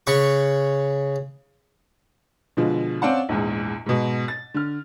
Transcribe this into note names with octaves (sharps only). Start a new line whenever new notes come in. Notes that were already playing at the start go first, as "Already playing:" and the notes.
C#3 F#5 B5 C#6
B2 D3 F3 G#3
C4 C#4 D5 F5 F#5 A5
A#1 E2 G#2
G#2 B2
A6
D3 F6